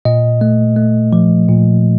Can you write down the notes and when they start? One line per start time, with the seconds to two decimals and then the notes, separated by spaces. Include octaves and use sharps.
0.05 A#2 D#5
0.41 A3
0.76 A3
1.13 F3
1.49 A#2